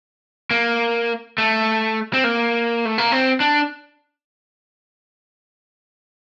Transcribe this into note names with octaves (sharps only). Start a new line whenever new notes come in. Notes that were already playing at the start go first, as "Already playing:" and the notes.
A#3
A3
C4
A#3
A3
A#3
C4
D4